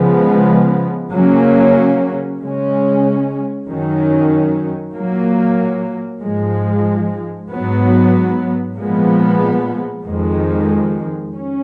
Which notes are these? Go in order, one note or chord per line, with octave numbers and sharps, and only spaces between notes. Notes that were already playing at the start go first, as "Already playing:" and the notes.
Already playing: C#3 F3 G#3 B3
C#3 F#3 A#3 C#4
C#3 G#3 C#4
F#2 D#3 F#3 C#4
A#2 F#3 A#3
G#2 F3 G#3
G#2 F#3 B3
A#2 F3 G#3 B3
F2 D#3 G#3
C#4